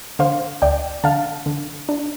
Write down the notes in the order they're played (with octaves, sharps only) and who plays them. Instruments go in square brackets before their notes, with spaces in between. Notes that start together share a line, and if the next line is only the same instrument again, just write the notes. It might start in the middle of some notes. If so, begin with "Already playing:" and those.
[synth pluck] D3 C5 F5
D2 D5 G5
D3 F5 A5
D3
D4